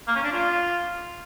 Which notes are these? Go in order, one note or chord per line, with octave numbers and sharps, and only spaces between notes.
A#3
C#4
D4
F4